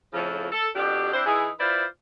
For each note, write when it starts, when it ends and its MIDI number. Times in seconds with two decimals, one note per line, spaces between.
0.13 0.47 41
0.13 0.47 45
0.13 0.47 49
0.13 0.47 53
0.52 0.67 69
0.75 1.13 41
0.75 1.13 47
0.75 1.13 62
0.75 1.13 67
1.13 1.22 60
1.13 1.22 62
1.13 1.22 64
1.13 1.22 72
1.26 1.49 52
1.26 1.49 63
1.26 1.49 64
1.26 1.49 68
1.60 1.84 64
1.60 1.84 65
1.60 1.84 71
1.60 1.84 72
1.60 1.84 74